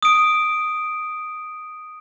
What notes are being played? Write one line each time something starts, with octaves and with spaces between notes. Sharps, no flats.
D#6 D7